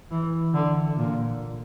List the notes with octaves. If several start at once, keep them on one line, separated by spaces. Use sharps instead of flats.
E3
D3
A#2